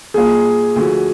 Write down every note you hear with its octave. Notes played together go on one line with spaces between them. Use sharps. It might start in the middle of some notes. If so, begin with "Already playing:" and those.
A#2 G3 A#3 G#4
D2 D3 F3 F#4